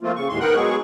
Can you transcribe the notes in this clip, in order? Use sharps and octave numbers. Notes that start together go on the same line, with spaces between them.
F3 A3 A#3 C4 F4
C#3 C#6
D#2 A2 G#3 C6
G#2 B3 A#4 F#5 G5 F#6
F#3 G#3 B3 G#4 C#6